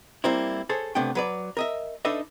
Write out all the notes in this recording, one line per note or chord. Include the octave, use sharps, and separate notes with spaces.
G3 A#3 C4 E4
G#4 A4 C5 C#5
C3 A3 B3 D4 G5
F#3 B4 D5
A#4 D#5 E5
D4 D#4 A4 B4 D#5 E5